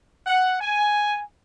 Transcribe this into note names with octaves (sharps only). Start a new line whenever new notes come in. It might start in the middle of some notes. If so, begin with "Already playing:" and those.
F#5
G#5